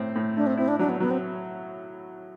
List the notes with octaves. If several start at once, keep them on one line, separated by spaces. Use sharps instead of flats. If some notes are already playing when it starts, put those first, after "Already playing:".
Already playing: A2 C4
A2
A3 D4
C4
C4 E4
D4
F#3 D4
B3
F#3 B3
C4